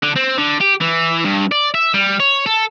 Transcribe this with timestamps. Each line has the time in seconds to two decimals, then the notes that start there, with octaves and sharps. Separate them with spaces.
0.03 D3
0.16 C4
0.38 D3
0.61 G4
0.81 E3
1.25 G2
1.52 D5
1.74 E5
1.94 G3
2.20 C#5
2.46 A4